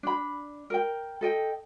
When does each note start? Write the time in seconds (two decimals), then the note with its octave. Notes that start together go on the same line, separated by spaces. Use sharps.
0.03 D4 B5
0.70 A#4 G5
1.21 A4 D#5 G5